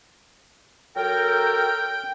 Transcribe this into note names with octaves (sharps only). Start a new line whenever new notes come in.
F#3 A4 A#4 G5